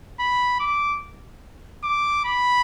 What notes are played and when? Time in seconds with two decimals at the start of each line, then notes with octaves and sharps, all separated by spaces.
0.19 B5
0.60 D6
1.83 D6
2.25 B5